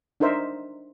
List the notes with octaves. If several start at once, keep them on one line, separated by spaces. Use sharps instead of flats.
D4 D#4 A#4 C5 E5